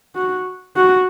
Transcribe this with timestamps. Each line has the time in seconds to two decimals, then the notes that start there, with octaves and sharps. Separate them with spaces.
0.15 F#4
0.76 F#4